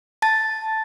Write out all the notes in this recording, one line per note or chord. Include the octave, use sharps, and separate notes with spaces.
A5 A6